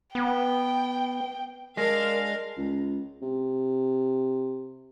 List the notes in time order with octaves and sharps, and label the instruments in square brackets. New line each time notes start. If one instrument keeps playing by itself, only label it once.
[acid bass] B3 [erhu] G5
[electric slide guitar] G#3 [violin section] D4 F5 [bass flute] A#4 [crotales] F6 A#6 C7
[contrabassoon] C#2
C3